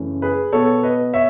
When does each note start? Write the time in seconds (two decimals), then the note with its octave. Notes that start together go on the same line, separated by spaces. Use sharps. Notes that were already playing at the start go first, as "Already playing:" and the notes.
Already playing: F#2 C#3 E3 A3 C#4
0.22 G#4 B4
0.52 B2 F#3 B3 A4 C#5
0.83 B4 D#5
1.14 C#5 E5